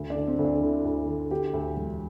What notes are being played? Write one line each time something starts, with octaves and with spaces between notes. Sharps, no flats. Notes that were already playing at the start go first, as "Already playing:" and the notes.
Already playing: D2
D4
D3
C4
D2
D4
D3 E4
D2
D3
D3 G4
D2
E1